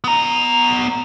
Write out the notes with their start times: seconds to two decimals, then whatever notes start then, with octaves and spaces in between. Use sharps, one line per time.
0.04 B3 A#5